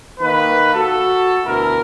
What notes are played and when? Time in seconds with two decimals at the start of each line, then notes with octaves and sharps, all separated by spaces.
0.20 D#3 A#3 B4
0.73 F#4 A4
1.43 D2 B2 E4 A#4